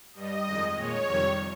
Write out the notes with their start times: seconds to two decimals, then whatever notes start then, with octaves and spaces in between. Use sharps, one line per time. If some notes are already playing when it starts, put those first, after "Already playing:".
0.13 G2 G3 D#5
0.44 F2 D#3 G#3
0.75 A#2 G#3 C#5
1.06 F2 C3 D#3 G3